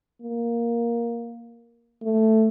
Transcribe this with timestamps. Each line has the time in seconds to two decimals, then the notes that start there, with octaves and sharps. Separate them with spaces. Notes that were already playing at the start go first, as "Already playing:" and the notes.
0.22 A#3
2.02 A3